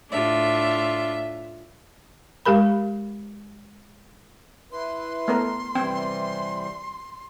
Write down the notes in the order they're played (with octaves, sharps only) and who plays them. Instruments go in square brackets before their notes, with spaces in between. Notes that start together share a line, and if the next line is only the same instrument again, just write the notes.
[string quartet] A2 E5 [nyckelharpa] D4 F4
[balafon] G#3 G4 A#4 B5
[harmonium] E4 B4 [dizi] C6
[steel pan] A3 B3 A#4
[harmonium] C3 E3 G3 [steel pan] C4 G5